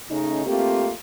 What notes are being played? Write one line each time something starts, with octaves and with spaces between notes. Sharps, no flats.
C#3 A3 C#4 D#4
A3 A#3 C4 F4 G4